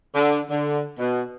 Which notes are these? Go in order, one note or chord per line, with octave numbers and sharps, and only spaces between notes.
D3
D3
B2